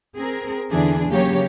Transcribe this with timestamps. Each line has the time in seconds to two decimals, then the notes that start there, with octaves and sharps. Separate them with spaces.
0.16 C4 G#4 A#4
0.71 E2 D3 E3 D4 G#4
1.09 C#3 F#3 A#3 G4 C#5